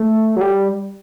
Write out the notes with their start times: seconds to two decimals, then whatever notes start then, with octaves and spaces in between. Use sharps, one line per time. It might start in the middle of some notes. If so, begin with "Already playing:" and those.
Already playing: A3
0.36 F#3
0.41 G3